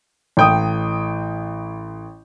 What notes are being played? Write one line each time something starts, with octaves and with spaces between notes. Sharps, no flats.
A1 G5 D#6